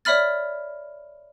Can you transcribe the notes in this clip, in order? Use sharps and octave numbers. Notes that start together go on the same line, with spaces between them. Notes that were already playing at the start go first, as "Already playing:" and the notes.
C#5 D5 E5 B5 F6 A6